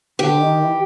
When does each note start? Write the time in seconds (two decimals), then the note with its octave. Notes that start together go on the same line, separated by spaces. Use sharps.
0.18 D3 G4
0.40 D#3
0.62 E3